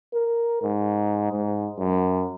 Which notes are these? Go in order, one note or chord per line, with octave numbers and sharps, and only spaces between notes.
A#4
G#2
G#2
F#2